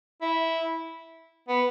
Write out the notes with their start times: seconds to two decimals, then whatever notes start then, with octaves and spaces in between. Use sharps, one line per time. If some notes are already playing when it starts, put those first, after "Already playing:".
0.22 E4
1.49 B3